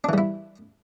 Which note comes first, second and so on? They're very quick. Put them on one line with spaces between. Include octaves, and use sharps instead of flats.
D4 E3 G3 E4